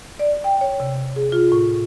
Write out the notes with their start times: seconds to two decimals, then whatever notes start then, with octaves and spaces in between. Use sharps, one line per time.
0.19 D5
0.44 G5
0.61 C#5
0.80 C3
1.16 G#4
1.32 F4
1.52 A2